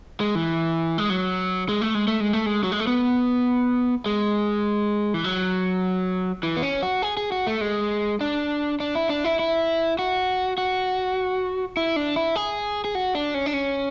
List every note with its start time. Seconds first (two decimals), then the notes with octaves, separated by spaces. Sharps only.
0.20 G#3
0.35 E3
0.98 G#3
1.10 F#3
1.69 G#3
1.82 A3
1.95 G#3
2.08 A3
2.20 G#3
2.33 A3
2.46 G#3
2.63 F#3
2.72 G#3
2.80 A3
2.87 B3
4.06 G#3
5.14 E3
5.24 F#3
6.43 E3
6.56 B3
6.63 C#4
6.83 F#4
7.02 G#4
7.17 G#4
7.32 F#4
7.47 A3
7.61 G#3
8.21 D4
8.80 D4
8.95 E4
9.09 D4
9.25 E4
9.39 E4
9.99 F#4
10.58 F#4
11.77 E4
11.96 D4
12.16 E4
12.36 G#4
12.85 G#4
12.95 F#4
13.15 D4
13.34 C#4
13.46 D4
13.54 C#4